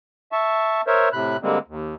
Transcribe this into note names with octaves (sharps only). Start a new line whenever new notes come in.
E5 A5 C#6
A#4 C5 C#5 E5
A2 C3 B5 F#6
D3 G3 G#3 A#3 C4
D#2